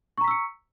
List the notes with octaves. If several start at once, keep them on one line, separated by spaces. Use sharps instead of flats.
A#5 C#6 E6 B6 C#7